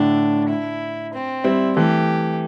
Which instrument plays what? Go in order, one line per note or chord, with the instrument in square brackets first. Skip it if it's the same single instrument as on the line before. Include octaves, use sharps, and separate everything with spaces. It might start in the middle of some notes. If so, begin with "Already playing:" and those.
Already playing: [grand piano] A2 D3 [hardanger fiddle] D4
[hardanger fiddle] E4
C4
[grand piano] G3 C4 [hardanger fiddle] E4
[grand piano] E3 A3 [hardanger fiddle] G4